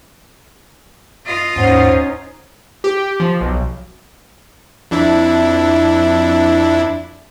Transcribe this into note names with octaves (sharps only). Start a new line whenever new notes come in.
F4 D#5
D#2 G#2 C#4 D#4 C5 F#5
G4
F3
B1
F2 D4 E4